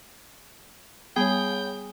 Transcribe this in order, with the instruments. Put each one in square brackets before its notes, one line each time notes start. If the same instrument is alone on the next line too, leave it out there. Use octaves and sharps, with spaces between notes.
[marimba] G3 B3 [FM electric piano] G#4 [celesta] C#5 B5 [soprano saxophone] G5